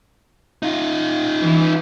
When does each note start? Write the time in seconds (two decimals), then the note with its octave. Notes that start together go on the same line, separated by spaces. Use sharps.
0.63 D#4 F4
1.42 E3